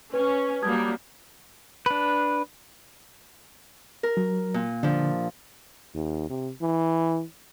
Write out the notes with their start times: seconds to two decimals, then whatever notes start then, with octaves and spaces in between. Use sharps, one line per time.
0.14 C#4 B4
0.62 F#3 G3 A#3 A5 D#6 G#6
1.86 D4 B4
4.03 A#4
4.17 F#3
4.54 A#2
4.83 D3 F3 D4
5.94 D#2
6.30 C3
6.62 E3